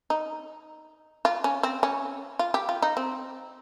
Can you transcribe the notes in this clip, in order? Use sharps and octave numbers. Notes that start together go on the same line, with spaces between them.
D#4
F4
C#4
C4
C#4
F4
G4
F4
D#4
C4